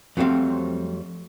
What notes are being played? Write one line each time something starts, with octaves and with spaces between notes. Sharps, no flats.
F2 F#3 G3 A3 C4 F5